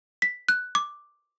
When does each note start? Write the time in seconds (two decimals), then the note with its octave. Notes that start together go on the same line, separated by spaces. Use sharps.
0.22 B6
0.48 F#6
0.75 D6